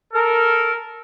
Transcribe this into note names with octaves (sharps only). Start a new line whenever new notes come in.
A4 A#4